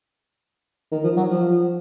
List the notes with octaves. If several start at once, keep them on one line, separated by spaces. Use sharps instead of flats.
D#3
F3
F#3
F3